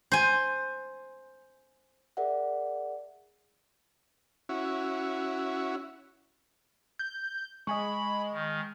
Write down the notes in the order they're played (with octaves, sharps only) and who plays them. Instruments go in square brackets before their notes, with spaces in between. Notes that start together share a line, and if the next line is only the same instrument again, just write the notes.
[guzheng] C5 G#5
[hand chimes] G#4 A#4 D5 E5 F#5
[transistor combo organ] C#4 E4 F#4
[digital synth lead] G6
[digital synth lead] G#3 [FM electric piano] D#5 G#5 C#6 [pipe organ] B5
[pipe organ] D#3